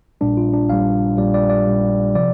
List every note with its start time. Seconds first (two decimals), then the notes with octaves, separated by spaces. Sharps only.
0.21 A#1 A#2 G3 D4
0.37 F4
0.53 D4
0.69 A#1 A#2 G3 F5
1.17 A#1 A#2 G3 D5
1.34 D5
1.50 D5
1.67 A#1 A#2 G3
2.15 C3 F3 D5